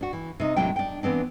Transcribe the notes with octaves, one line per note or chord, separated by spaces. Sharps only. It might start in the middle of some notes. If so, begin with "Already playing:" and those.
D4 F#4
E3
C3 D#4
D#2 A2 C3 F#3 D4 G5
D4 G5
E3 B3 C4 D4